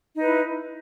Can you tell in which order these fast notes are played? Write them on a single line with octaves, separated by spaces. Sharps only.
D#4 B4 E4